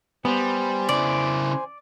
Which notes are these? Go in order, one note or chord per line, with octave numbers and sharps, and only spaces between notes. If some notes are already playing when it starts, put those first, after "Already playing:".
G3 B3 C5 G#5
C#3 E4 D5